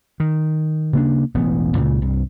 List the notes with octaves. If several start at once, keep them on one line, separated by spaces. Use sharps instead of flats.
D#3
C#3 A#3 D4
E1 A1 B3
C#2 A#2 C#3
C2 G2